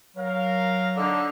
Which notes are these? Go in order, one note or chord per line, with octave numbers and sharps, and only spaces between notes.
F#3 A#4 F5
D3 D#4